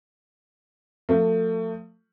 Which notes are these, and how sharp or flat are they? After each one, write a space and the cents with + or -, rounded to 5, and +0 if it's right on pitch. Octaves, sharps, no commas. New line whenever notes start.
F3 +30 A3 +30